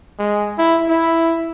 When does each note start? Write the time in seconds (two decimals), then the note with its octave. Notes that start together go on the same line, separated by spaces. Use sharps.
0.19 G#3
0.58 E4
0.88 E4